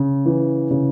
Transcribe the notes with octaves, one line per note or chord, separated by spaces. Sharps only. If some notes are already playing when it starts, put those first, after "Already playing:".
Already playing: C#3
E3
C#3